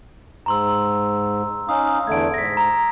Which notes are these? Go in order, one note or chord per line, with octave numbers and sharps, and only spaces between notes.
G#2 A#5 C6 E6
C#4 D#4 F5 D#6
E2 D3 A3 G#6 D7
G#2 A#6 B6
A#5